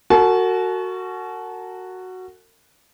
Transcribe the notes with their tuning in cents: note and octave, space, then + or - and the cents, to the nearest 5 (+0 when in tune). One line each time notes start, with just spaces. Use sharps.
F#4 +0 A#4 -45 A5 -40